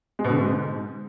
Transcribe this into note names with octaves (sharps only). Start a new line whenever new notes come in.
G#3
B2
D3
G#2